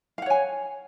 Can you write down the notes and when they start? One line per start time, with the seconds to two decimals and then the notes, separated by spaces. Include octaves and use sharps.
0.18 F5
0.22 F#5
0.26 C#5
0.30 G#5